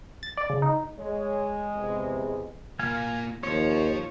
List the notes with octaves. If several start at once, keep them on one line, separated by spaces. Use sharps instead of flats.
A6
D5
C#3
D#4
G#3 C#5
E2 C3
A#3 F4 F5 G#5
D#2 F4 C5 C#5